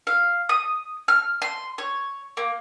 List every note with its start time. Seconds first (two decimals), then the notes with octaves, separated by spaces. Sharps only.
0.07 F5
0.49 D#6
1.08 F6
1.42 C6
1.78 C#5
2.37 A#3